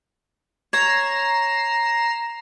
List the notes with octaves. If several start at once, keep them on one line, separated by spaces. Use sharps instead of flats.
C#5 A#5 C7 E7